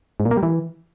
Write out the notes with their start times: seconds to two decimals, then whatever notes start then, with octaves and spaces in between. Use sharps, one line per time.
0.20 G#2
0.25 A#2
0.31 A#3
0.37 G3
0.43 E3